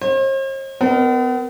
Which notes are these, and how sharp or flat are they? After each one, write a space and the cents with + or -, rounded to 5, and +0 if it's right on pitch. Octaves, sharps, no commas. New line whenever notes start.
C5 +45 D#5 +0
B3 +40 A#4 +5 D5 +40